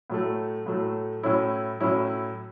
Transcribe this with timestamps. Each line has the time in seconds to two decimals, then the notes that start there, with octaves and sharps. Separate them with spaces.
0.10 A2 F#3 A3
0.66 A2 F#3 A3
1.23 A2 F#3 C#4 E4
1.80 A2 F#3 C#4 E4